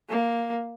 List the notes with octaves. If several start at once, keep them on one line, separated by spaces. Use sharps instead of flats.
A#3